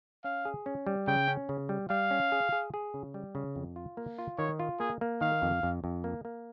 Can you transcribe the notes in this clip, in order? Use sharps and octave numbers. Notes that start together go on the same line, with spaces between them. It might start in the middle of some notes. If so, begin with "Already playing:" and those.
C#4 F5
G#4
C#4
G3
C#3 G5
C#4
C#3
G3
G3 F5
C#4
G#4
G#4
G#4
C#3
G3
C#3
F2
F4
A#3
F4
D#3 C#5
F4
A#3 G#4
A#3
D#3 F5
F2
F2
F2
A#3
A#3